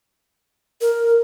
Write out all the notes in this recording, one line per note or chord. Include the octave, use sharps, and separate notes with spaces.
A#4